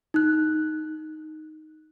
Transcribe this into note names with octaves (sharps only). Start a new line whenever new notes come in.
D#4 F#6